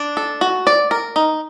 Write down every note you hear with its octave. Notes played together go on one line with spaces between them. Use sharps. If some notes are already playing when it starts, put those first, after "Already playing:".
Already playing: D4
A4
F#4
D5
A#4
D#4